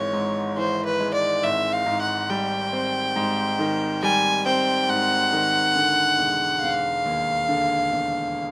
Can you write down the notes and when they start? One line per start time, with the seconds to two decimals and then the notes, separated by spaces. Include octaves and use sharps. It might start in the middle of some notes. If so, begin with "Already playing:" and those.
Already playing: G#1 E3 G#3 C#5
0.13 G#2
0.57 E3 C5
0.85 B4
1.00 G#3
1.14 D5
1.43 G#1 E5
1.72 F5
1.86 G#2
2.01 F#5
2.29 G3 G5
2.73 C4
3.16 G#2
3.59 D#3
4.02 G3 G#5
4.46 C4 G5
4.89 G#2 F#5
5.33 D#3
5.75 D3
6.19 E1
6.62 E1 F5
7.05 D#2
7.49 D3
7.92 E1